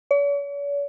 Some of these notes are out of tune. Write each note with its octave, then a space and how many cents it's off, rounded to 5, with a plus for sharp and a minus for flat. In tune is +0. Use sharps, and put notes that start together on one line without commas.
C#5 +45